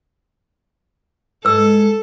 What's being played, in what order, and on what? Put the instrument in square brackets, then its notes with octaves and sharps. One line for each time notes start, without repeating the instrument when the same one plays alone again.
[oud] G#2 G#3 [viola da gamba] A4 [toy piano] B4 E6